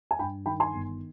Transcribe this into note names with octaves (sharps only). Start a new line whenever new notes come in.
G#5
G2 G5 B5
D#3 G5 B5
G#5 C6
G1